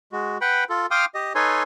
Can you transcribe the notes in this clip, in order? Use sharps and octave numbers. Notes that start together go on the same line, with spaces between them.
G#3 F#4
B4 F#5 G5 B5
F4 A4
F5 G5 C6 D6 D#6 F6
G4 D#5
D#4 A4 B4 C#5 G#5 C6